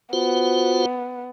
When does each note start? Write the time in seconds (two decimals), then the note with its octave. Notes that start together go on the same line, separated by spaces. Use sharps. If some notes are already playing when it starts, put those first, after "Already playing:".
0.13 B3 F4 F#4 C5